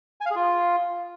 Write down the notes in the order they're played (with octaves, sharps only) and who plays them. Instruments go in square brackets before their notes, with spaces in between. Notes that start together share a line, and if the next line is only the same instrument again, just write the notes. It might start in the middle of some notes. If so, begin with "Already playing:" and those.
[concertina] G#5
F5
G#4
F4